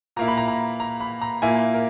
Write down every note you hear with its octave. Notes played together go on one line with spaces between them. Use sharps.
A#2 A#3 E4 A#5
B5
A#5
A#5
A#5
B5
A#5
A#2 A#3 E4 G#5
A#4